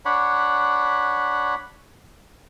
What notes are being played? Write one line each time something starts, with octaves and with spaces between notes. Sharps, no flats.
D4 C#5 F#5 B5